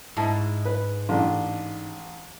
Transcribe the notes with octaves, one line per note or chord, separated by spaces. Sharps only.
G#2 E4 A5
B4
A1 D4